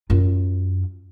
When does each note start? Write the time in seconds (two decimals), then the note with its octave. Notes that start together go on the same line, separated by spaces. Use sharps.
0.10 F#2 F4